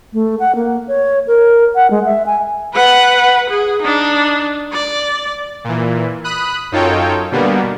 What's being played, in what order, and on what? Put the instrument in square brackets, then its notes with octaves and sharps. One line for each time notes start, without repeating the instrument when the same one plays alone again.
[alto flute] A3
F#5
A#3
C#5
A#4
F#5
G#3
E5
G#5
[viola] B4 F#5
G#4
D4 D#4
D5
[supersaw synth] A#2 E3
B5 D#6 F#6
F#2 D#4 F4 A4 C#5 G5
B2 D3 G3 A#3 B3